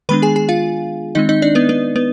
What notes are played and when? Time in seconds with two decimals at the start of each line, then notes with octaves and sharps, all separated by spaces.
0.09 D#3 G#3 B3 D4 B4 B5
0.22 G#4 G#5
0.36 G#4 G#5
0.49 F4 F5
1.15 D#3 G#3 C4 D#4 D#5
1.29 D#4 D#5
1.42 D4 D5
1.55 B3 B4
1.69 B3 B4
1.96 B3 B4